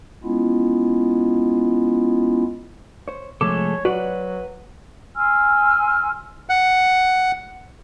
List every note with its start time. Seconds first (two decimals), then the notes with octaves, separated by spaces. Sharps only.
0.24 G#3 B3 C#4 E4 F4
3.08 C5 C#5
3.41 C3 F3 G#3 A3 A4 C#5 D6
3.85 F#3 F#4 B4 D5 F#5
5.15 G#5 C6 E6 F6
6.49 F#5